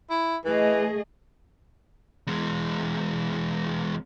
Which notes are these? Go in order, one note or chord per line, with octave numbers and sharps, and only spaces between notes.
E4
E3 A3 G#4 D#5
E2 G#3